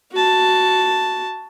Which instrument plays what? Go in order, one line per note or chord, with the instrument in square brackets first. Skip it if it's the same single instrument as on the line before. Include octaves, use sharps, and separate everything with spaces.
[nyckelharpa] F#4 A5